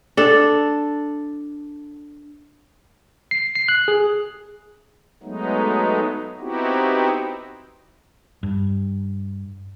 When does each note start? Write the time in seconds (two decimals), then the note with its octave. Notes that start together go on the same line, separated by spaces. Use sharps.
0.17 D4 A4
3.31 C7
3.55 C7
3.68 F#6
3.88 G#4
5.23 F#3 G#3 A3 B3 D#4
6.40 B3 C4 D#4 E4 F#4 G4
8.43 G2